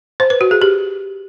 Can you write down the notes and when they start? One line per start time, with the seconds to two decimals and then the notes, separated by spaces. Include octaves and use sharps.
0.20 C5
0.30 B4
0.41 F#4
0.51 G#4
0.62 G4